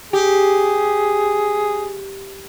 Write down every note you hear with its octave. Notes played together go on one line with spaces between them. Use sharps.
G4 G#4